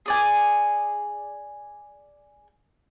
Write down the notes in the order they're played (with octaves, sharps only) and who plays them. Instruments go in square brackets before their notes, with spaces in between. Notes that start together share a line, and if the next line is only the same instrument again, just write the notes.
[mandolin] G#4 D5 G#5